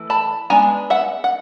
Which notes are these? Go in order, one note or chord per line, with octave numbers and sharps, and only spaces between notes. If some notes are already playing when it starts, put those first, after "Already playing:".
Already playing: E3 A3
A5 B5
G#3 B3 D4 G#5 A#5
E5 F#5
F#5